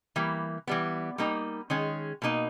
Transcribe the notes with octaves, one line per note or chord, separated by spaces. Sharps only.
E3 G3 A#3
E3 G3 B3
G3 A#3 D#4
D#3 G#3 C#4 G#4
B2 A#3 D#4